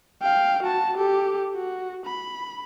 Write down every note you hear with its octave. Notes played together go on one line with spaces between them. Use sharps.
F5 G5
F#4 A5
G4 A4
F#4
B5